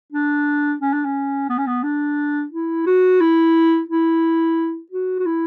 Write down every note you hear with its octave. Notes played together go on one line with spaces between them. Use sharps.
D4
C#4
D4
C#4
B3
C#4
B3
D4
E4
F#4
E4
E4
F#4
F#4
E4